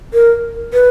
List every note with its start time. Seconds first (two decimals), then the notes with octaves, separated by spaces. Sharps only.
0.13 A#4
0.73 B4